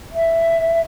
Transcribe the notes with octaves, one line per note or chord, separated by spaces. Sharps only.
E5